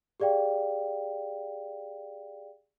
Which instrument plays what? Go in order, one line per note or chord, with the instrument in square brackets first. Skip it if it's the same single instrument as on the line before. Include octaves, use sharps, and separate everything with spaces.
[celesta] G4 G#4 D5 F5 G5